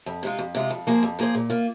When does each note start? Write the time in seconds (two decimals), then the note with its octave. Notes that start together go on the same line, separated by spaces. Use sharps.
0.06 F2
0.23 C3 G#3 F4
0.39 F2
0.55 C3 G#3 F4
0.70 F2
0.87 F3 A#3 G#4 C5
1.03 F2
1.19 F3 A#3 G#4 C5
1.35 A#2
1.50 A#3 F4